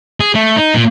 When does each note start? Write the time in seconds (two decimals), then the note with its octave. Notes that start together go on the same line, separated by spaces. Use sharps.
0.20 G#4
0.35 A3
0.57 D#4
0.75 A#2